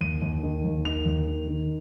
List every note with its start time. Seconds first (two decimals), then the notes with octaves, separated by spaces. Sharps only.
0.01 D#2 D#7
0.22 D#2
0.43 D#3
0.65 D#2
0.85 D#3 F7
1.06 D#2
1.28 D#3
1.48 D#3